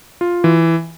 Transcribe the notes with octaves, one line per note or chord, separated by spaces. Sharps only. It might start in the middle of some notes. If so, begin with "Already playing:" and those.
F4
E3